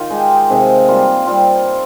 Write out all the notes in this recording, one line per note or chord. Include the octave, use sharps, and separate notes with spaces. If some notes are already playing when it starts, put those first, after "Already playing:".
Already playing: D#3 F4
G#3 D#4 G4
C3 D#3 G#3
G3 A#3 F4
G3 C4 F4